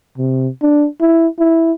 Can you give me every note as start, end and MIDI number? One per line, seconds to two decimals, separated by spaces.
0.18 0.48 48
0.62 0.87 62
1.01 1.27 64
1.39 1.72 64